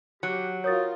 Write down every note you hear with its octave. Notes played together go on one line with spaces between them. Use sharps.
F#3 G4
F4 F#4 A#4 C#5 D#6 A6